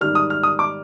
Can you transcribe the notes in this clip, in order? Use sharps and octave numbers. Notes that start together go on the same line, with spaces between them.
G#2 D#3 G3 F6
D#6
F6
D#6
D6